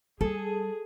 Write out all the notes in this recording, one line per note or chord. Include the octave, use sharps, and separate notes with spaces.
G3 G#4 A4